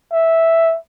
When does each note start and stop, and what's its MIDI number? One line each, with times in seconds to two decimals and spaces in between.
0.13 0.77 76